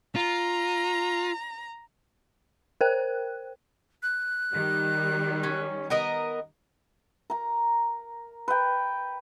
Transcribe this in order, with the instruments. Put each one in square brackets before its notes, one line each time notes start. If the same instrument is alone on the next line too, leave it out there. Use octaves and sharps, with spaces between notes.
[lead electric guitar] F4 [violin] A#5
[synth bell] A#4 C5 G5 F#6
[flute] F#6
[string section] D#3 G3
[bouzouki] C#4
B3 A#4 D#5
[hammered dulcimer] A#4 A#5
B4 G5